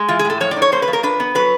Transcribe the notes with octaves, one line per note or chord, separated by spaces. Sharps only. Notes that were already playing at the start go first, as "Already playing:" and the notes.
Already playing: G#3
E3 F4
G#4
A2
A4
F3 C#5
D5
D#4
C#5
A#3 C5
B4
F3
A#4
D4 B4
B3
F#3 B4